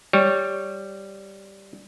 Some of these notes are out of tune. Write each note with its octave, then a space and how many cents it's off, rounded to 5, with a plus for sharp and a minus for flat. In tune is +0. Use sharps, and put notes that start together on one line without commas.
G3 +0 C#5 +0